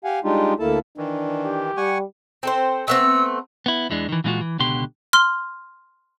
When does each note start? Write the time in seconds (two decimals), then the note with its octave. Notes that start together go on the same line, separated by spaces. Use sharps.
0.04 G4 F5 F#5 G#5
0.24 G3 G#3 D4 D#4 F4 G4
0.60 D2 A#3 E4 A4 A5
0.97 D#3 E3 D4
1.45 G4
1.77 G3 F#5 G#5 C#6
2.43 C4 A4 C5
2.88 A3 B3 C4 E6
3.66 B3 E4
3.90 E2 E3 G#3 D4
4.09 D#3 E3
4.24 A#2 E3 G#3 D#4 F4 F#4
4.41 E3
4.59 C#2 B2 D3 G4 C6
5.13 C6 F6 G7